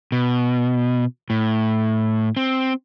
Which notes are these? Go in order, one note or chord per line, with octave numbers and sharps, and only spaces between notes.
B2
A2
C4